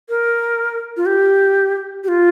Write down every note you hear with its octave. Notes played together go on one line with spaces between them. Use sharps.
A#4
F4
G4
G4
F4